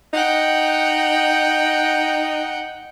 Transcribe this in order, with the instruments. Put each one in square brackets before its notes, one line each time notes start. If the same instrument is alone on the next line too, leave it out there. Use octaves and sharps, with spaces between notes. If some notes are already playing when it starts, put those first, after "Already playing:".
[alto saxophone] D#4 [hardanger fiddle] F#5 G5